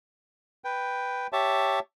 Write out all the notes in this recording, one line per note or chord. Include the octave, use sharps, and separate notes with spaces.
B4 G5
G4 C#5 E5 A5